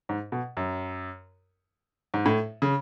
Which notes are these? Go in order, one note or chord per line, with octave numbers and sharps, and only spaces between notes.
G#2
B2
F#2
G#2
A2
C#3